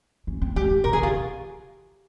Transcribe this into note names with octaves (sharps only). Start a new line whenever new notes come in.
C#4
C4
G#3 G4
D#3
C3 A#4
C#3 G#4
D#3 F4